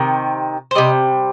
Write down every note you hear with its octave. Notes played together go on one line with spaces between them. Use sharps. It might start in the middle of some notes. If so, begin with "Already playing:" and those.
Already playing: C3 D#3
C5
C3 G3 D#5